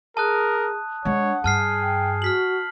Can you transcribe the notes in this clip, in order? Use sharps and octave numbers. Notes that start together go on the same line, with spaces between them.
G#4 A#4 A5 D#6 F#6
G#3 D4 C#5 F#5
G2 G#4 A5 F6 C7
G5
F#4 F6 B6 F#7